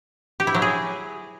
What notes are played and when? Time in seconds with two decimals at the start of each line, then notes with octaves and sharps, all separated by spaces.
0.40 G4
0.47 E4
0.55 F#3
0.62 G#4